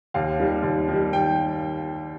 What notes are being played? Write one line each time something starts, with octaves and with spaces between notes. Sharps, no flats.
D#2 F5
D#3 G3
D#2
D#3 G3
G5